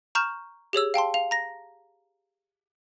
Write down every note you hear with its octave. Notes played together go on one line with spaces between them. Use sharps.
A#5 C#6 F6 G6 E7
G4 G#4 C#5 E6
F5 G5 A5 C6
F5 F7
A#5 A#6